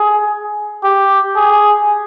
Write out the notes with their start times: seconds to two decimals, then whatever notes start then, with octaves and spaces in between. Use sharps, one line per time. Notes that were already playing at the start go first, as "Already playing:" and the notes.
Already playing: G#4
0.83 G4
1.36 G#4